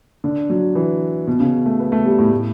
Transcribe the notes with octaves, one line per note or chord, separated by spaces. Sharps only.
D3
F#3
E3
B2
C#3
A3
B3
A3
G3
A2
A2